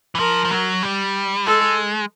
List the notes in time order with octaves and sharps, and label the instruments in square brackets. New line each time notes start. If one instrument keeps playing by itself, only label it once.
[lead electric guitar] E3
[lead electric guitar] F3 [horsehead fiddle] A#4
[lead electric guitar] F3
F#3
G3
[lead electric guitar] G#3 [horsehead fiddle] A4